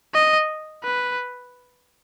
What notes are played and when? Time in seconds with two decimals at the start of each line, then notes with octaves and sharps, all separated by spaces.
0.14 D#5
0.84 B4